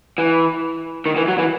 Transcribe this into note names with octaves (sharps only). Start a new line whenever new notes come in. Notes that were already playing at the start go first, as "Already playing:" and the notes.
E3
D#3
E3
F#3
E3